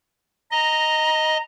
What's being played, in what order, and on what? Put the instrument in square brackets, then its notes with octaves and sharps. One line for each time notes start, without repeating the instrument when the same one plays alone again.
[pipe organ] D#5 [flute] A#5